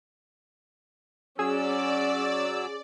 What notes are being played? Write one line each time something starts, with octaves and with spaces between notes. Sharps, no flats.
F#3 C#4 G#4 D5 E6